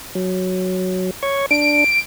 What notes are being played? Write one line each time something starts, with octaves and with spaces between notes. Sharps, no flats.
F#3
C#5 C#6
D4 D7